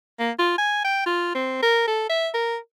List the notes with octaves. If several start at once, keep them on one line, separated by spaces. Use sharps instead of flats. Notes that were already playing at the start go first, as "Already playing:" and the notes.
A#3
F4
G#5
G5
F4
C4
A#4
A4
E5
A#4